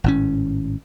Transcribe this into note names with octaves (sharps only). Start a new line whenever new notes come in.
G#1 A2 C#4